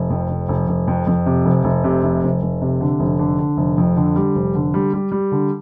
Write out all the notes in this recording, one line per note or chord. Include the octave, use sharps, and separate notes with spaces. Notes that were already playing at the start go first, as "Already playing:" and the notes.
Already playing: F1
F2
F1
F1
F1
F2
F2
C3
F1
F1
C3
F1
F1
F1
C3
D3
F1
D3
D3
F1
F2
D3
G3
F1
D3
G3
G3
G3
D3